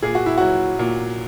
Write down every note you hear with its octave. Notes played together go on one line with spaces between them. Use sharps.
A#2 G#4
F#4
E4
F#3 F#4
A#2